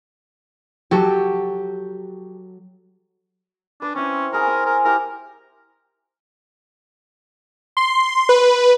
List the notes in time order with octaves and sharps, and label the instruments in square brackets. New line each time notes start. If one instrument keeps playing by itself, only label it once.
[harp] F#3 F#4 A4 [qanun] G4
[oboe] D4 [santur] B4
[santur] C4 E4 [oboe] C#4
[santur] G#4 C5 [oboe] A#4
[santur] G#5 A#5 E6
[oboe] A#4
[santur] E4 G4 [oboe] A#4
[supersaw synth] C6
B4